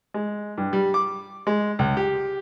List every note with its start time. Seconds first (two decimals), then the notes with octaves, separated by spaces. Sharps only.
0.14 G#3
0.58 G2
0.73 G3
0.94 D6
1.47 G#3
1.79 C#2
1.97 G4